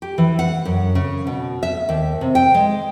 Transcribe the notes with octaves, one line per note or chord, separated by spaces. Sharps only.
G4
E3
F#5
F#2
C#3
B2
E5
D#2
C3
G5
G#3